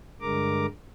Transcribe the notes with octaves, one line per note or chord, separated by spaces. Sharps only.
G2 D3 G#3 A#4 A#5 D6